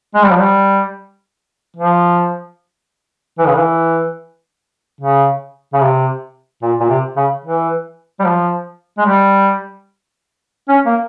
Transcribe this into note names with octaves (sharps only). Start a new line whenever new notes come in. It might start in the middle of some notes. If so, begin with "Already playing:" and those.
G#3
G3
F3
G3
F3
E3
C#3
E3
C#3
C#3
C3
A#2
A#2
C3
C#3
E3
G3
F3
G#3
G3
C#4
A#3